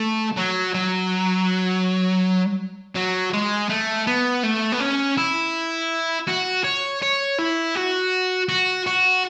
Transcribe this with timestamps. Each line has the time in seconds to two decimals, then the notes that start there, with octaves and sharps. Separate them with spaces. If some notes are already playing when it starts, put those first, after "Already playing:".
Already playing: A3
0.37 F#3
0.74 F#3
2.95 F#3
3.33 G#3
3.70 A3
4.07 B3
4.43 A3
4.72 B3
4.80 C#4
5.17 E4
6.27 F#4
6.64 C#5
7.02 C#5
7.38 E4
7.75 F#4
8.49 F#4
8.86 F#4